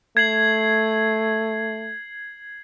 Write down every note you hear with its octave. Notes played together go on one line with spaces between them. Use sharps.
A3 G#6 C7 F#7